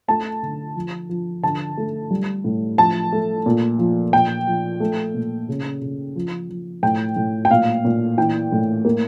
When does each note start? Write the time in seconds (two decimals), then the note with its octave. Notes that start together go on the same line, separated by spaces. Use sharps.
0.08 A3 A5
0.43 D3
0.75 F3
1.09 F3
1.43 D3 A5
1.77 A3
2.11 G3
2.44 A2
2.78 F3 A5
3.12 A3
3.46 A#2
3.79 F3
4.13 A#2 G5
4.47 F3
4.80 A3
5.14 A#2
5.49 C#3
5.82 C#3
6.16 F3
6.49 F3
6.83 A2 G5
7.17 A2
7.45 G5
7.50 A#2 F5
7.85 A#2
8.18 E3 G5
8.52 A2
8.85 A#3